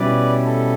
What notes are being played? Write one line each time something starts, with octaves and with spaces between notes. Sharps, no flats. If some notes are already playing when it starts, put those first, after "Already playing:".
Already playing: B2 G3 C#4 E4 B4 D5
A4